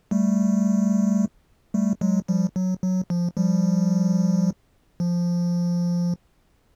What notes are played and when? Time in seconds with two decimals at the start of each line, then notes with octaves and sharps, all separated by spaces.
0.11 G3 A3
1.74 G3 A3
2.01 F#3 G#3
2.28 F3 G3
2.56 F#3
2.83 F#3
3.10 F3
3.37 F3 G3
5.00 F3